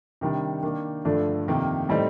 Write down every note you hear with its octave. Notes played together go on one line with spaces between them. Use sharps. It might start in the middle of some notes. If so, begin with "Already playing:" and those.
C3 D#3 G3 D4
D#3 A#3 D4
G2 D3 F3 A3 D4
F2 C3 D#3 A#3
A2 G3 C4 D#4